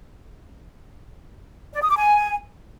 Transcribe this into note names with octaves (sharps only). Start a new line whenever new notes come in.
D5
D#6
D6
G#5